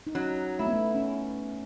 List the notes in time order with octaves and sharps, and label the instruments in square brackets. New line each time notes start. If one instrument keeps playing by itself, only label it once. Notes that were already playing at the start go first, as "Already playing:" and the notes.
[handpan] D#4
[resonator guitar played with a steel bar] F#3 [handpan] C#4
[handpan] A3 [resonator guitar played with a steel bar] E4
[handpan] B3
A3
C#4